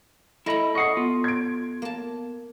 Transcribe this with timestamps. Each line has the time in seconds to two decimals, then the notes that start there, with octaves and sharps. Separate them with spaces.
0.46 A3 E4 D#5 A#5 B5
0.75 D#5 F#5 C#6 D#6 C7
0.97 B3 F4
1.24 G#6 D7
1.82 A#3 A5